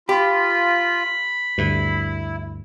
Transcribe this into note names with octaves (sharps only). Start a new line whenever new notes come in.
F4 G4 B5
D2 G2 E4